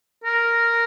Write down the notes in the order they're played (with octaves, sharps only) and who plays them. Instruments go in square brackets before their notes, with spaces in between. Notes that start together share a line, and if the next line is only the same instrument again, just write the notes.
[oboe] A#4